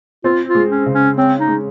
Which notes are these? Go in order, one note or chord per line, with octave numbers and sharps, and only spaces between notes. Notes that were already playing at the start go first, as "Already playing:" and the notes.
C4 F4
F4
G#3
C#4
C#3
C#4
C4 C#4
D#4
G#3